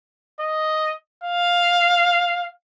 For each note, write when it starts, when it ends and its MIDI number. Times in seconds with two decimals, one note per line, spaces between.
0.40 0.94 75
1.24 2.48 77